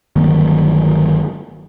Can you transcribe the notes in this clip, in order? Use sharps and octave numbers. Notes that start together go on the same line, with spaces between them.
G1 D#3 F#3 A#3